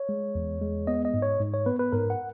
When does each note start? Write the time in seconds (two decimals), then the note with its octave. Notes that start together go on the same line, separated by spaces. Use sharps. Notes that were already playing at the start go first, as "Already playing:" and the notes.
Already playing: C#5
0.09 G#3
0.35 E2
0.61 G#3
0.87 B3 D#5
1.05 D#5
1.14 G#2
1.22 C#5
1.40 G#2
1.54 C#5
1.66 B3 B4
1.79 B4
1.92 G#2 A#4
2.10 F#5